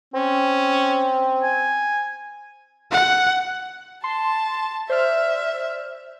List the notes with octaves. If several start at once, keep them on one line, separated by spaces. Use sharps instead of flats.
C4 C#4
G#5
F#5
A5 C6
C5 D5 E5 F6